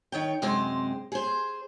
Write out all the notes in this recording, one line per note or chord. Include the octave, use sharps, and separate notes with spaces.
D#3 C#5 G5
F#2 C3 G#3 C4 C5
G#4 C5